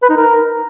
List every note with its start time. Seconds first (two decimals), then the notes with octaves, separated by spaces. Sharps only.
0.02 B4
0.10 D#4
0.17 A#4